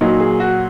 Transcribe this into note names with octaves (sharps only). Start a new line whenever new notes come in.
A#2 F#3 D#4
G#4
F#4